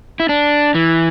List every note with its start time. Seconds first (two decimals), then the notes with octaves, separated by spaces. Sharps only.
0.20 E4
0.29 D4
0.74 E3